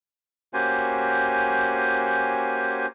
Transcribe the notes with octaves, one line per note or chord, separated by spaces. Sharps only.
A#3 C#4 F#4 G4 C5 G#5